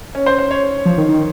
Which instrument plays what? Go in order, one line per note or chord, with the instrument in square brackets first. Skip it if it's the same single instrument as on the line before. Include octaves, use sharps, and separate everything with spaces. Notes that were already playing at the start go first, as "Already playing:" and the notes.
[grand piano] C#4
C5
C5
C#5
[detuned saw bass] F3
D#3
D#3